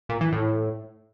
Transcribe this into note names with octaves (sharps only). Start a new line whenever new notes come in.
A#2
E3
A2